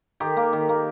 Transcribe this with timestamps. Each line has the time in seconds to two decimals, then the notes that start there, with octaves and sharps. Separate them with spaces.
0.20 D#3 G4
0.36 A#3
0.53 D#3
0.69 A#3